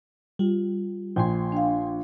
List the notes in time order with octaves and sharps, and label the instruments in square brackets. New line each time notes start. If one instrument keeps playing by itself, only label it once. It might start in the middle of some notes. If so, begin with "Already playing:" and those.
[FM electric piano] G3 [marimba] F4
[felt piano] A#1 [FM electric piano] G5 G#5 C6
[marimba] D4 F5